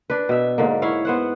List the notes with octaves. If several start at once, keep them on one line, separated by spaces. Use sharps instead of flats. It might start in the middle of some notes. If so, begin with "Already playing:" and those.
D4 B4
B2 E5
G#2 D3 A#3
E4 C#5 F5
B3 C5 F#5